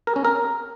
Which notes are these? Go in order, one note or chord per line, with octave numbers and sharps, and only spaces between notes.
A#4
C#4
A#4